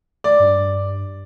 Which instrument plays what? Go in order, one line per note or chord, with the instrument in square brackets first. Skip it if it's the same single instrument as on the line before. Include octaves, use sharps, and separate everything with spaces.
[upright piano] D5
[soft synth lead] G2